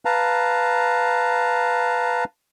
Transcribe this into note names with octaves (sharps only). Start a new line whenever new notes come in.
B4 F5 A5 A#5